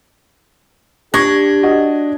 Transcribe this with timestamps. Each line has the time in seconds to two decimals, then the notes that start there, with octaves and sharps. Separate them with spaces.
1.14 D4 G4 C#6 G#6 A#6
1.63 F#4 D#5